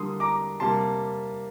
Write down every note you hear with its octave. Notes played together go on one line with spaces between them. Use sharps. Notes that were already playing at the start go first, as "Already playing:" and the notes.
Already playing: D3 G3 A#3 C6 D#6
A#5 D6
C3 G3 A#3 A5 C6